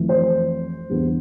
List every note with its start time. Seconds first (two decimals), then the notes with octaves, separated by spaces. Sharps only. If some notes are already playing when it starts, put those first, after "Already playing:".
Already playing: F2 E3 A3
0.09 C5
0.90 E2 D3 G3 B3